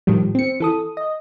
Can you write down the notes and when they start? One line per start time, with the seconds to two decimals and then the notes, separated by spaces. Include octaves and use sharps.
0.07 A2 D#3 F3 G3
0.35 C4 C#7
0.60 E3 A4 D#6
0.97 D#5